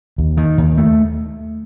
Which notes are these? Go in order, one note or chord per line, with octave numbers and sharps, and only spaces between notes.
D#2
D#3
D#2
A3